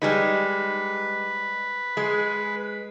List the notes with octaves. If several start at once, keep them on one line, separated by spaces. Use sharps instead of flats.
G3 G#3 D#4 B4
G#3